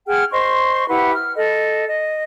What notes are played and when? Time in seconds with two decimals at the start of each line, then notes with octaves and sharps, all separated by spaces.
0.08 G#4 F#5 G5 F6
0.32 C5 D#5 C6 C#6
0.89 E4 G4 B4 F#5
1.15 F6
1.36 A4 D#5
1.87 D#5